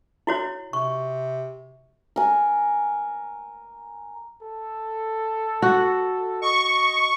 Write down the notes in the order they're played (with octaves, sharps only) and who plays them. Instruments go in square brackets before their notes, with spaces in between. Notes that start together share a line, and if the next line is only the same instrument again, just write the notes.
[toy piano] E4 F#4 C#5
[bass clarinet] C3 [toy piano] C#6
[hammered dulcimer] A#4 G#5
[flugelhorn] A4
[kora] F#4
[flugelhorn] D#5 [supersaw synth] C#6